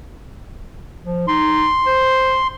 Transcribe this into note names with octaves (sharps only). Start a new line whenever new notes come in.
F3
D#4 C6
C5